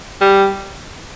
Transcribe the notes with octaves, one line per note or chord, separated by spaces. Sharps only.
G3